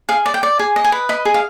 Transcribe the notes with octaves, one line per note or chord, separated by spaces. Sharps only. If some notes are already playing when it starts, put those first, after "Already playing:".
G#4 F5
D5
G5
D5
G#4 G#5
D#5
G#5
B4
D#5 B5
G#4
F5